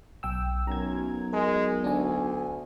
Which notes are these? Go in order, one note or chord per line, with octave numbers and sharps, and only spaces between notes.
B1 G5 E6
B1 F#2 A#5 G#6
G#3 A#4
D2 D4 G#5